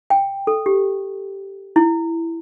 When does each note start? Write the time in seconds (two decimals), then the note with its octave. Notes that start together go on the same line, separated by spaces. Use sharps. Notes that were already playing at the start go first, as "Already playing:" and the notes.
0.10 G5
0.47 A4
0.66 G4
1.76 E4